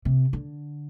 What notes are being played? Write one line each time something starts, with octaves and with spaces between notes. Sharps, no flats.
C3
D3